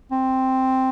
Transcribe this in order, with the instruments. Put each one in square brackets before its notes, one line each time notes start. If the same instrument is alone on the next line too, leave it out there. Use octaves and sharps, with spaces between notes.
[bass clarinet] C4